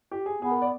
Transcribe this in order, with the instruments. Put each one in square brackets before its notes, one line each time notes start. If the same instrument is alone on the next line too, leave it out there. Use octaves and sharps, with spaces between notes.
[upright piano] G4
G#4
[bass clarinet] B3 [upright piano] G#4
[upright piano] A#4
D5